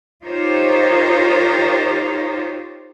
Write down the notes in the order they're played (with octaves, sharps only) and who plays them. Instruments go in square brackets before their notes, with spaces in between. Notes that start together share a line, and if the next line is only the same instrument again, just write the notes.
[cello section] D#4 F4 G4 A#4 C5 C#5